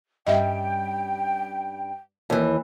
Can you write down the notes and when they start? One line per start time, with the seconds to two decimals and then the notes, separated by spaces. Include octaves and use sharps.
0.27 G2 G3 C#4 D#5 E5 G5
2.30 D#2 E3